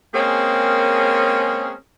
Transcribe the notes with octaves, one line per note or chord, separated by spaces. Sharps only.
G#3 A#3 C4 C#4 G#4 A#4